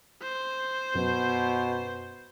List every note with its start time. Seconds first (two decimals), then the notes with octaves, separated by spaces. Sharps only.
0.22 C5
0.95 F#2 B2